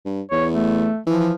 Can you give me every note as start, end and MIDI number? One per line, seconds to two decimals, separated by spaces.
0.06 0.21 43
0.31 0.88 40
0.31 0.46 73
0.55 0.99 57
1.07 1.33 52
1.07 1.32 53